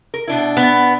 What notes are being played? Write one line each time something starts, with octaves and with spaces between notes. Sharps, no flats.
A#4
B2 D4 E4
B3